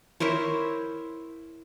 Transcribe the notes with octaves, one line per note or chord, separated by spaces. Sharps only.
E4 A#4 C5 C#5